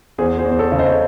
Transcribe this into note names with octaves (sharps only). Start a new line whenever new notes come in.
E2 G#4 C5
G#4 C5
E2
C5
A4 C#5
C#3
C5 D#5
C5